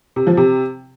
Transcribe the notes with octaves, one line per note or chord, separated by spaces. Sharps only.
C3
F3
C3